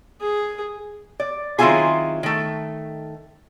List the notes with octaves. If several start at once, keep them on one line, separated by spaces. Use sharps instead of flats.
G#4
D5
D#3 F#3 C4 E4 F4 G#4
D#3 A3